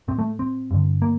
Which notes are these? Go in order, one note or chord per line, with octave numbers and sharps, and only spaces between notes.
A2 C4
A3
C4
G2 D3
A#3